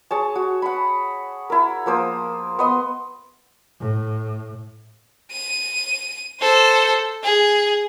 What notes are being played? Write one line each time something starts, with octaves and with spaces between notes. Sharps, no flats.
G#4 C#5 A5
F#4
F#5 B5
E4 A#4
F3 A#3 C5 D#6
B3 D#5 C6
A2
D#7
A4 C5
G#4